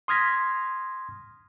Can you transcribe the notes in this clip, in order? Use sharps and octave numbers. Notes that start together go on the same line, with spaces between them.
C6 D#6 F6 G#6 A#6 B6